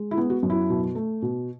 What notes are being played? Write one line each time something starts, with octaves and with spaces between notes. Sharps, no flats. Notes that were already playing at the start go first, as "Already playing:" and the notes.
Already playing: G#3
E4
B3
F#4
F#2
E4
B2
A3
B2